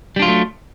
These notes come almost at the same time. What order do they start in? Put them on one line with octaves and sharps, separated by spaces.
G3 D4 F4 F#3 A3